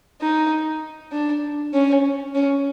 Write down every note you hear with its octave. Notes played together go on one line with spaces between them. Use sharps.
D#4
D4
C#4
C#4